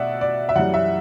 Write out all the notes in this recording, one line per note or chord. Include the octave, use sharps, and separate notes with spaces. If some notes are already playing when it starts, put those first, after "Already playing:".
Already playing: B2 D5 E5 F#5
D5
E5
F#2 E3 G3 F#5
E5